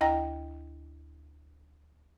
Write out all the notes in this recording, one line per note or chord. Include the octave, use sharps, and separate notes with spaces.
D2 E4 D#5 G5 A#5 A#6